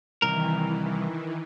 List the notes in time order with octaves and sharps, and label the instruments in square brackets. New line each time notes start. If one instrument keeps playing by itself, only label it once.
[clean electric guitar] C2 A#4 [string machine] D#3 E3